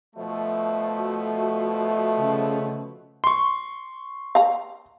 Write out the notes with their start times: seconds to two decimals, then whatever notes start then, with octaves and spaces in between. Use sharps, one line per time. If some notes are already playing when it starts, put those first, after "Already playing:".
0.16 B2 F3 A3
0.98 F#4
2.17 C#3
3.24 C6 C#6
4.35 F5 A#5